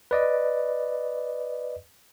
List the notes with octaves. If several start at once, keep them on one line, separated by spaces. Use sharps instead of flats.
B4 D5 D#5